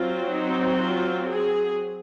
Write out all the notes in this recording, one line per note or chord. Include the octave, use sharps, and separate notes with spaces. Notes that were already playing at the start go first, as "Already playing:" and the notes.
Already playing: F#3 C4 F4
D#4
F4
G#4